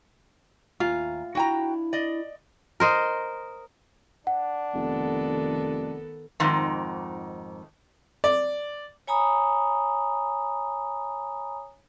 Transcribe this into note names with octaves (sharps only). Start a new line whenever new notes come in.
D#2 A2 F4 G#5 A#5
D4 E4 F#4 G5 A#5
D5 D#5
A#4 C5 D#5
D4 F#5
F1 D#3 B3 A4
F2 G#2 D#3
D5
C#5 G#5 A#5 B5 D#6